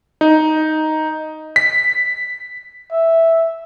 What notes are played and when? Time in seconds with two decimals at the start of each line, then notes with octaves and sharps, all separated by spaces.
0.21 D#4
1.56 B6
2.92 E5